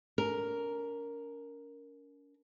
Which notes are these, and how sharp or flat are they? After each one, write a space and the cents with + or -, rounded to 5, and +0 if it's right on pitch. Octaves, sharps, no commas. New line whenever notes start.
C#4 +45 A#4 +0